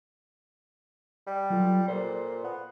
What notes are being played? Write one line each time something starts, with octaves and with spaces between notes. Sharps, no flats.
G3
F#3 F4 A4
A#2 A4 C5
B3